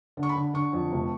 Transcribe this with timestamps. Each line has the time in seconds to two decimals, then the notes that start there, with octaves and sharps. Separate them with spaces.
0.17 D3
0.23 C#6
0.29 B5
0.36 D3
0.54 D3 C#6
0.73 F2
0.92 F1